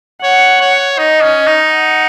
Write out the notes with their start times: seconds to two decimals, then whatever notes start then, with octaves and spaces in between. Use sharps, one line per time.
0.23 C#5 F#5
0.61 C#5
0.98 D#4 D#5
1.23 C#4
1.47 D#4
1.73 F#5